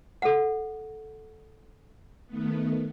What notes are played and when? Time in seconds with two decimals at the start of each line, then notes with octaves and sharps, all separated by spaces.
0.22 A4 F#5
2.27 D#3 A3 B3